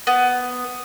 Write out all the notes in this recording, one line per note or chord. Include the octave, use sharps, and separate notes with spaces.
B3